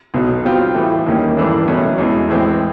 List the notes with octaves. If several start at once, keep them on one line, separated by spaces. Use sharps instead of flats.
B1 B2 F#3
B2 G3 C4 F4
A2 E3 A3
D#2 D#3 G3 A#3 C#4
A1 G2 E3 A3 D4
B2 F#3 A3 C#4 E4
E2 B2 G#3
A2 E3 G#3 C4